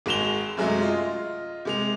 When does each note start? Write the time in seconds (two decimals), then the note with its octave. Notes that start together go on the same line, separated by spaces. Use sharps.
0.06 G#1 G#3 F#4 E7 F7 G7
0.57 F#2 C3 F#3 G#3 A3
0.81 F4 D#5
1.65 C3 G#3 F7